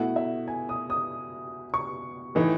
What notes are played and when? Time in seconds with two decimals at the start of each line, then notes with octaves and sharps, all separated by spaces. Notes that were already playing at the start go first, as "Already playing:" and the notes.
Already playing: B2 A3 E4 F#5
0.16 E5
0.48 G#5
0.69 D#6
0.90 D#6
1.74 C#6
2.35 A2 E3 A3 D#4